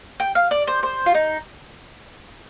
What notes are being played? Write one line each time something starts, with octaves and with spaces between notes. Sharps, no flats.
G5
F5
D5
C5
C5
F4
D#4